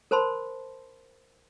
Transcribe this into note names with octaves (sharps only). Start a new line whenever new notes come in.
A#4 C5 A5 B5 C6